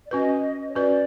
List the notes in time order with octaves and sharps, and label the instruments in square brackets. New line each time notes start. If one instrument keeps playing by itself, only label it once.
[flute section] D5
[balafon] C#4 F#4 B4 [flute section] D#5
[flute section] C#5
[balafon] C#4 F#4 B4 [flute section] D5